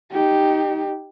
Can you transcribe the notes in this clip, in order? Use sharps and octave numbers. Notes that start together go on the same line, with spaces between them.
D#4 G4